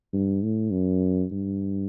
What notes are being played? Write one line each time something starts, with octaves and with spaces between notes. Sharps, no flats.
G2
A2
F#2
G2